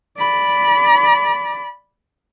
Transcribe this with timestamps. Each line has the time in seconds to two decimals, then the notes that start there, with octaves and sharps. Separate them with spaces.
0.18 D5 B5